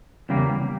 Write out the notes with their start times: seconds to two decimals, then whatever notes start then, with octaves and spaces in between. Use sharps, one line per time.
0.29 E2 C#3 G3 A#3